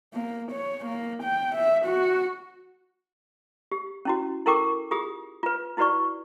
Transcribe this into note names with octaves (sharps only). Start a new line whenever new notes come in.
A#3
C#5
A#3
G5
E5
F#4
G4
C#4 E4 F#4
E4 A4 A#4 G5 C#6 D6
F4 G4 G#4 D#6
F4 B4
D#4 E4 F#4 B4 D5 C#6